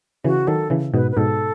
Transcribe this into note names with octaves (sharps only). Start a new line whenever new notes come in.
C#3 E3 F#4
D#3 F#3 A4
C#3 E3
G#2 B2 B4
B4
G#2 B2 A4